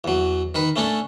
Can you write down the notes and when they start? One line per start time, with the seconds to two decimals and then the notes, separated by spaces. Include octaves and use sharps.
0.04 E2 F#3
0.55 D#3 A#4 B4
0.76 A3 C#4 D4 A4